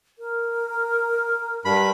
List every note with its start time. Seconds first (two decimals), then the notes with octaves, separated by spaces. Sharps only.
0.19 A#4
1.65 G2 B5